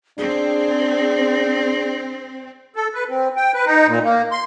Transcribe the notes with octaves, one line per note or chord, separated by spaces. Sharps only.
C4 D4 G#4
A4
B4
C4
G5
B4
D#4
A#2
A#3
C6